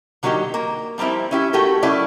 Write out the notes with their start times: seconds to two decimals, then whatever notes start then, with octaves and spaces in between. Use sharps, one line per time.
0.23 D3 F#3 A#3 D#4 G4
0.54 A#3
0.98 F3 G3 A#3 C4 E4
1.31 C#4 E4 G4
1.53 A3 F#4 G4 A4 A#4
1.83 F#3 A3 C#4 E4 D5